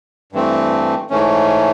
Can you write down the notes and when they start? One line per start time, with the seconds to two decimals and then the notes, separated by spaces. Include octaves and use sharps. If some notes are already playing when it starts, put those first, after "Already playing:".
0.32 G2 E3 A3 C4
1.10 G#2 E3 A3 C#4